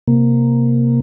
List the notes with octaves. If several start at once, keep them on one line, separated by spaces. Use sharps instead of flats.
C3 A#3